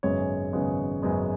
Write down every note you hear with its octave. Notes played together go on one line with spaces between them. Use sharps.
G#1 F#2 C#3 G#3 B3 C#5
G#1 F#2 C#3 G#3 B3
G#1 F#2 C#3 G#3 B3